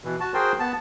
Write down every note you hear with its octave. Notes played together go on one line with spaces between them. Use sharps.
B2 E3
F#4 A5
F#4 G#4 A#4 C5 G5 C6
B3 A5